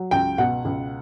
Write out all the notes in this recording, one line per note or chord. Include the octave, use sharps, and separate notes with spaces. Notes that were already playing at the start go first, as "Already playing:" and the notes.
Already playing: F#3
C#2 G5
B2 F#5
C#2